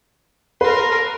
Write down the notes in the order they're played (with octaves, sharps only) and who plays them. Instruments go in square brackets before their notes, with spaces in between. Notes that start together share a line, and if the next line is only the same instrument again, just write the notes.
[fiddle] A#4 C6 [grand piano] B4